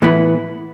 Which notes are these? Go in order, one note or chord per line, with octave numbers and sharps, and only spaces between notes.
A2 E3 B3 E4